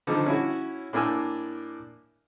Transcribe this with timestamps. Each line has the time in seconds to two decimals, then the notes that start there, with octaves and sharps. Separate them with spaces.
0.07 D3 D#3 F3 G3 D#4 A4
0.26 C#4 E4 F#4
0.93 A2 A#3 D4 G#5 E6